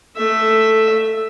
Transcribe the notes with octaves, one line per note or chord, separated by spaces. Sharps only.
A3 E5